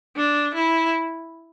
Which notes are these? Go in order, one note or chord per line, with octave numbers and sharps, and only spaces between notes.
D4
E4